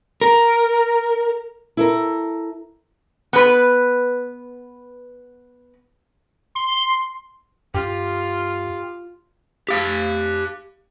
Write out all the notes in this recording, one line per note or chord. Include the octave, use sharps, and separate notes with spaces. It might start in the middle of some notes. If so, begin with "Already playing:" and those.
A#4
E4 A4 A#4
B3 B4
C6
G2 F4 G4
G4 F5